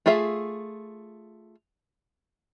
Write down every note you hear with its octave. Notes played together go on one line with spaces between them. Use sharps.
A3 F4 G#4 E5 F5